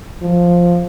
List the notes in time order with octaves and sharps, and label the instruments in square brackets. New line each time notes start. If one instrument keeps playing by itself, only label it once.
[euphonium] F3